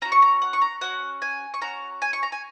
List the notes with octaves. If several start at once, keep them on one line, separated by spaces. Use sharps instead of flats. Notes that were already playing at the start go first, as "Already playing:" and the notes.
C#4 F#4 A#5
C#6
A#5
F#5
C#6
A#5
C#4 F#4 F#5
G#5
C#6
C#4 F#4 A#5
G#5
C#6
A#5
G#5